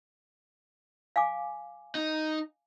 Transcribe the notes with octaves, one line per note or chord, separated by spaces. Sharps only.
F5 G#5 D6
D#4